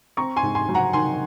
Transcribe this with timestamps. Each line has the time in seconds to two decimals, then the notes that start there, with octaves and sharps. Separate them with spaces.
0.17 C4 A#5 C#6
0.36 G#5 C6
0.43 G#2
0.55 G#5 C6
0.69 F#3
0.75 F#5 A#5
0.93 D#3 G#5 C6